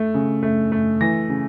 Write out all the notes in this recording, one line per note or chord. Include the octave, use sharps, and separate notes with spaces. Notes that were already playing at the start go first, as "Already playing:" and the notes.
Already playing: A3
C#3
A3
A3
E3 A#6
C#3